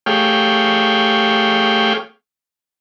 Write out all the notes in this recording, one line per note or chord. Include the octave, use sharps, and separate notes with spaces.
A3 G4 G#4 C#5 F5 G5